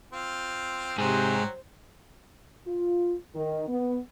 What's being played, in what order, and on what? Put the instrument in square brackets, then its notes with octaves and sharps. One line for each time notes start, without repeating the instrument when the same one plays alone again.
[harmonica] C4 F4
[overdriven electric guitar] G#2 G#4 [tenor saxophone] C3 [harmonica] F#3 G5 [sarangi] C5
[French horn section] F4
D#3
B3